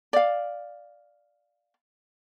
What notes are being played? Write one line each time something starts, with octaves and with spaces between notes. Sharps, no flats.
D5 F5